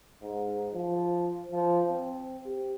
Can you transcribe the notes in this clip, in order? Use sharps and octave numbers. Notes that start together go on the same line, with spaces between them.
G#2
F3
F3
C4
G4